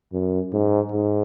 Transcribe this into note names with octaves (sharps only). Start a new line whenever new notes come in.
F#2
G#2
G#2